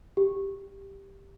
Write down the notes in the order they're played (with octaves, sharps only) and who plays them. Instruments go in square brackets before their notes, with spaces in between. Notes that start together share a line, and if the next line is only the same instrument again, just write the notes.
[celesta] G4